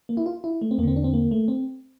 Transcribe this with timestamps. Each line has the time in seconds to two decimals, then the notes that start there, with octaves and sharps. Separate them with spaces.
0.09 A#3
0.17 E4
0.26 F4
0.44 E4
0.62 A3
0.71 C4
0.78 E2 A#3
0.83 D3 C4
0.96 D4
1.04 C4
1.13 A#3
1.31 A3
1.48 C4